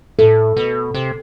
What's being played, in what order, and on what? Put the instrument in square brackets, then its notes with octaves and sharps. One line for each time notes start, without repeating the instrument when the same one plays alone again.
[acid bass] A2 [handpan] A4
[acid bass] B2
C3